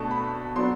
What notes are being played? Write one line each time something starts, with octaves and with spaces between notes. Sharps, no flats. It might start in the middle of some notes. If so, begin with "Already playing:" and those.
Already playing: B2 A3 D4 A5
B5
F#3 B3 D4 C6